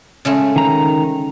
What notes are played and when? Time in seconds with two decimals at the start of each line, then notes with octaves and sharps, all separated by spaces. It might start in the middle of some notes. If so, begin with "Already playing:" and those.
0.25 C#3 G#3 A3
0.56 D#3 A#5